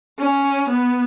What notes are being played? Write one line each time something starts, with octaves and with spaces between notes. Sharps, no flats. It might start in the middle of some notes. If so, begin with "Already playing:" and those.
C#4
B3